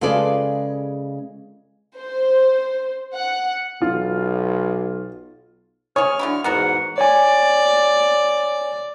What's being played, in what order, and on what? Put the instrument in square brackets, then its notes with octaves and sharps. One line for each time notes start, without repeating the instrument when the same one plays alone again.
[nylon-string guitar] C#3 G#3 F4 A4 B4 D5
[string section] C5
F#5
[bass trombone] B1 [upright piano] F4
[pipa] C#4 G#4 [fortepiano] C#5 [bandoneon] F6
[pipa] D3 F#3 E4
[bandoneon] E2 G#2 F#5 [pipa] B3 F#4 A#4
[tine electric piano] C#5 G#5 [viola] D5